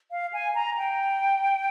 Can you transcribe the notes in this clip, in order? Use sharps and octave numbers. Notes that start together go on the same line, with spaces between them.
F5
G#5
A#5
G5